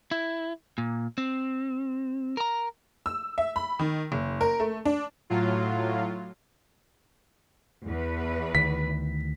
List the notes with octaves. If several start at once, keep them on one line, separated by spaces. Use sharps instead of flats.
E4
A#2
C4
A#4 A#5
E6
E5
B5
D#3
F#1
A#4
A3
D4
A2 F#3 F4
E2 B4
D2 D#3 B6